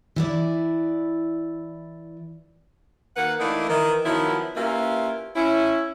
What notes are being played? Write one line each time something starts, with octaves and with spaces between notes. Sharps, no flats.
E3 E4 D5
D#3 A#3 B4 F#5
E3 A3 A#3 D4 D#4
D#3 E3
D#3 F3 F#3 B3 E4
A#3 C#4 E4 F4 G4 B4
C#4 E4